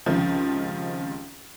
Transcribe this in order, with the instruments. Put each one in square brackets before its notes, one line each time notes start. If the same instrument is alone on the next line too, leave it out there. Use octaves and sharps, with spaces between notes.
[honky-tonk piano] C#2 F#2 C3 D#3 F3